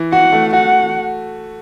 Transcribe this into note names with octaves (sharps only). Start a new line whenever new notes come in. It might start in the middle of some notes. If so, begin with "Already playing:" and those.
Already playing: E3
F#4 F#5
A3
F#4 F#5